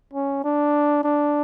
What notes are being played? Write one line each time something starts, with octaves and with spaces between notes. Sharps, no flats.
C#4
D4
D4